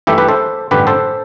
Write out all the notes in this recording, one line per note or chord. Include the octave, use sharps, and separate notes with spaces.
G2 E3 A3 E4 G4
G4 B4
A4 C5
A1 G2 D3 G4 B4
A4 C5